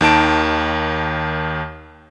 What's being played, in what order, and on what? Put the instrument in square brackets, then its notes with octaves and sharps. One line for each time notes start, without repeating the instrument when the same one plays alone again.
[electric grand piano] D#2 D#3 A5 D7